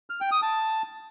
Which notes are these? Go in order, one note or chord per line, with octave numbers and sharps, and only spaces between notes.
F6
G5
D#6
A5